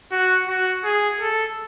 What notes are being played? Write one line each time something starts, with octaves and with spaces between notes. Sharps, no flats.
F#4
F#4
G#4
A4